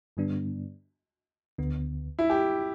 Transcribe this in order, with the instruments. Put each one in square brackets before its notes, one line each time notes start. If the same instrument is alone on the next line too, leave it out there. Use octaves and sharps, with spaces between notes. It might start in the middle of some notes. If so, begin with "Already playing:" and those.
[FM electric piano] G2 D3 G3 B3 D4
D2 D3 B3
[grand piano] E4
G4